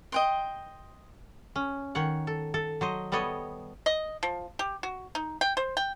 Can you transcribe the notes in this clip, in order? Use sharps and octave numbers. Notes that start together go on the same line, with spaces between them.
D#5 G5 C6
C#4
D#3 C#5 F#5
A4
A4
F#3 C5 D#5
G3 B3 A4 C#5 D#5
D#5
F3
G4
F#4
D#4
G5
C5
G5